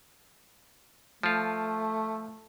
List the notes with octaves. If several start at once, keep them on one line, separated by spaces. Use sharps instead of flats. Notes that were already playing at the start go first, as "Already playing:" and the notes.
F3 A3 F4